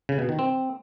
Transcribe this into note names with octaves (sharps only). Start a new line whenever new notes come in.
C#3
B2
D#3
C4